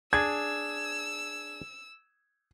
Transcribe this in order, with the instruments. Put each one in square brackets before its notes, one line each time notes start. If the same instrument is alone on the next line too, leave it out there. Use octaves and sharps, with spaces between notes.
[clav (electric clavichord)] D4 G#4 [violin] E6 [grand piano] G#6